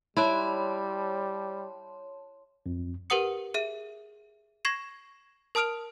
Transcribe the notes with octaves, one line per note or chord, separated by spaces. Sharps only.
G3 E4 C#5 A5 C6
F2
G4 A#4 B4 F#5 D#6 C#7
G#4 E5 D#7
C#6 G#6 A#6 C7 E7
A#4 A5 D#6 F6 D7 F7